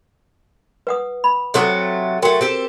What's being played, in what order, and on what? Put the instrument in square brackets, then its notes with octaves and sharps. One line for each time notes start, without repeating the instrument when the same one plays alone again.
[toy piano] B4 F#5 D#6
B5
[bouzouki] C3 F#3 A3 [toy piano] A4 F#5 D#6
[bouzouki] F#3 A3 [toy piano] F#4 A#4 G5
[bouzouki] C4 G4 A4